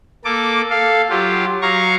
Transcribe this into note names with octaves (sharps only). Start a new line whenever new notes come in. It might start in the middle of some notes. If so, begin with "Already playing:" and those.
A#3 A4 D6
A4 F5
F#3 F4 G4
F#3 F5 A#5 C#6